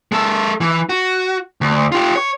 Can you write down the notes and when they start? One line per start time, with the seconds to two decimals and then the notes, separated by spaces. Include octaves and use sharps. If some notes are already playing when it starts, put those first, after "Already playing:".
0.12 G#3 A4
0.61 E3
0.89 F#4
1.61 D2
1.92 F4 G4
2.16 C#5